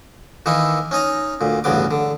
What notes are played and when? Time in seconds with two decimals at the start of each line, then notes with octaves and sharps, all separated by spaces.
0.46 D#3 E3 A#3 D#4 E4
0.91 C#4 D#4 D#5 A#5
1.41 D2 A#2
1.64 A1 D2 G2 C#3 B3 D6
1.91 D3